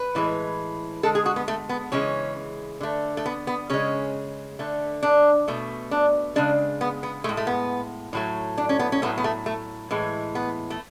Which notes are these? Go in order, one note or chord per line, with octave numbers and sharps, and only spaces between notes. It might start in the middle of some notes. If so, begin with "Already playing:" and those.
Already playing: B4
A2 E3 G#3
D3 G#3 A4
G#4
F#4
B3
A3
B3
C#3 E3 G#3 C#4
D3 A3
A3
B3
B3
C#3 G#3 C#4
D3 A3
D4
B2 A3
D4
C#3 G#3 D4
B3
B3
A2 G#3 A3
A3
B3
A2 F#3 A3
D4
C#4
B3
C#4
A2 F#3 A3 B3
B3
A3
A3
A2 E3 G#3
B3
A3